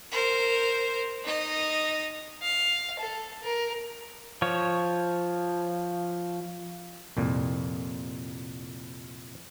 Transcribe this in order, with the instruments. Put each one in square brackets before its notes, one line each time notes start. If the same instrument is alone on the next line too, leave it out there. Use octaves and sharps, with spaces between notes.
[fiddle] A#4 C5
D#4 D#5
F5
A4
A#4
[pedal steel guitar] F3 C#5
[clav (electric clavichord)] C2 F2 A#2